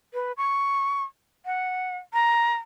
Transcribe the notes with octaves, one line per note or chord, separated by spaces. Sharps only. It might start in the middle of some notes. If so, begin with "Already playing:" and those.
B4
C#6
F#5
A#5